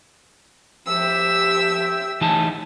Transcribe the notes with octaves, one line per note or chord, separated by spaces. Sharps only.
F3 G4 E5 E6
E3 A3 D#4 G#5 A5